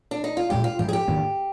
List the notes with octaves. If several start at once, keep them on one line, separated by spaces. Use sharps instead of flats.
D4
D#4
F4
A#2 G#3 D4 G4
F4
G#2 F3 G#3 G4
G#4
G4
G#2 D#3 A#3 D4